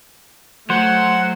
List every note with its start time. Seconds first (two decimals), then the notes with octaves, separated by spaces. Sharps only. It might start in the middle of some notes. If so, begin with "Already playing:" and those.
0.70 F#3 A3 C5 F#5